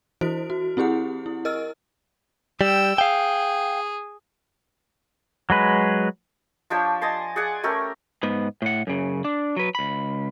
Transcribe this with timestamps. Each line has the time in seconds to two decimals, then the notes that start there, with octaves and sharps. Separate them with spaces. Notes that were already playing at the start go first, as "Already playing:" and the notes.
0.21 E3 E4 F#4 C5 D7
0.50 F#4
0.77 C4 E4 G4 G#4 F#5
1.26 E4
1.45 A#4 D#5 E6 F6
2.61 G3 G5 E6
2.98 G#4 F5 G5
5.50 F#3 G#3 B4
6.70 F3 D4 G4 C#5
7.01 D#5 G#5 A5 C6
7.36 G#4 D5 F#5 G#5
7.63 A3 C#4 G4 A#4
8.23 G#2 B3
8.62 A2 F#5
8.87 F#2 C#3
9.25 D4
9.56 F#3 B4
9.75 C#2 B5